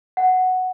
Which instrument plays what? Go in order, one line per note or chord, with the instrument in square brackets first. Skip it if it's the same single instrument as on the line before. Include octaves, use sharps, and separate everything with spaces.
[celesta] F#5